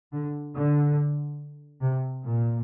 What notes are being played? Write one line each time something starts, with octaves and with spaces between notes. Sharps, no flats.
D3
D3
C3
A#2